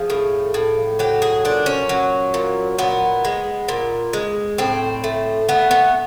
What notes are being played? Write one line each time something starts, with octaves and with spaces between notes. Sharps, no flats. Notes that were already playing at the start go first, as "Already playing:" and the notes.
Already playing: F3 G#4
A2
A2
F#3 G4
G#4
A#2 D4
C#4
F#3
A#2
A#2 B3
G#3
A#2
G#3
A2 C4
A3
A3 B3
B3